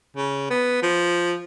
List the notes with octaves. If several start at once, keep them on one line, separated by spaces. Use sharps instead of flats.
C#3
B3
F3